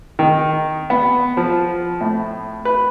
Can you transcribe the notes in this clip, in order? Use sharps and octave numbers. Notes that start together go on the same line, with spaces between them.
D#3
B3
F3
A2
B4